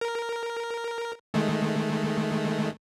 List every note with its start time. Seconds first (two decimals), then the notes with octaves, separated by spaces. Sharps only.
0.01 A#4
1.34 D#3 G#3 A3